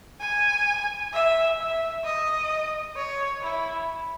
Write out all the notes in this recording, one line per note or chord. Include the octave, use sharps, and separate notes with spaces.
G#5
E5
E5
D#5
C#5
E4